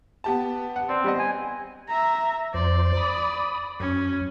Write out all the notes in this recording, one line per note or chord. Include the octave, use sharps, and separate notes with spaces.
B3 G4 A5
F#5
C4 D5
G3 B3 D#5
G#5
E5 A#5
F2 C5 D5
B5 D#6
F#2 C#4